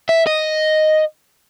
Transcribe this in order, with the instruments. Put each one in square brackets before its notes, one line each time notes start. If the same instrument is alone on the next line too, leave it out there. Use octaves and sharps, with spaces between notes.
[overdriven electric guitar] E5
D#5